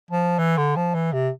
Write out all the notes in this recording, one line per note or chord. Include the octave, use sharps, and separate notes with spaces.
F3
E3
D3
F3
E3
C3